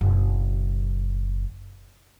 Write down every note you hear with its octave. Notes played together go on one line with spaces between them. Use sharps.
F#1 B2